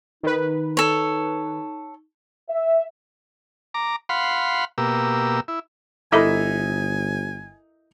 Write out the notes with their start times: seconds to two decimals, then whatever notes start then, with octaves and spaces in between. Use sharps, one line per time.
0.23 D#3 D#4 B4
0.77 A4 C#5
2.48 E5
3.74 A#5 D6
4.09 F5 F#5 B5 C6
4.78 B2 A#3 G4 E6
5.48 E4
6.12 G1 D#4 E4 A4 A#4 E5 G#5 B5